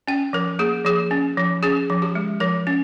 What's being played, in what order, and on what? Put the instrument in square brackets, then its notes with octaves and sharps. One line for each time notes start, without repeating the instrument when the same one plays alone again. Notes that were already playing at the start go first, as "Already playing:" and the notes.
[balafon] C#4 G5
F3 A#4
A#3 G#4
F3 G#4
C#4
F3
C#4 G#4
F3
G4
G#3
F3 A#4
C#4